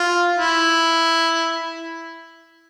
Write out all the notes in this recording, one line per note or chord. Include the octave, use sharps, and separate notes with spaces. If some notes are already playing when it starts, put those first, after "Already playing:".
Already playing: F4
E4